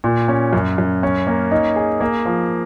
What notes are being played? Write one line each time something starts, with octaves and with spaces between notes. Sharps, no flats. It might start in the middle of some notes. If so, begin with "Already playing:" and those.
A#2
C#4
F#2
F#2
C#4
A#3
D#4
G#4
A#3
F3